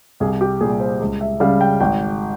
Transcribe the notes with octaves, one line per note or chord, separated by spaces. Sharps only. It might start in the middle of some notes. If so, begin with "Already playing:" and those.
C2 G#4
G4
A#2 G3 G#4
C5
C#2
E5
C#3 G3 F5
G5
G#1 G5